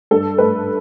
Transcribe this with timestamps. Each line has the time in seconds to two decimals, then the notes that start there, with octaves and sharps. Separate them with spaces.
0.11 G2 A4
0.38 A3 B4